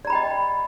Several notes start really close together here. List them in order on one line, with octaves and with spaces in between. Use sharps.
D5 A#5 B5 G5 D#5